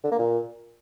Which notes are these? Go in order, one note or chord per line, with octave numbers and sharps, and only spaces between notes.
D3
A#3
A#2